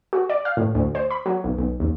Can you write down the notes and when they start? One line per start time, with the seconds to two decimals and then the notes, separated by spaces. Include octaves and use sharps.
0.13 F#4
0.29 D5
0.45 F5
0.57 A2
0.75 D2
0.95 C5
1.11 B5
1.26 F#3
1.44 B1
1.58 B1
1.80 D#2